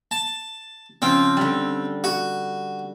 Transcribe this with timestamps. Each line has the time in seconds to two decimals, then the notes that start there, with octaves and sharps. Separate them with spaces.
0.11 A5
1.02 C#3 F3 C4
1.37 D3 G3
2.04 F#4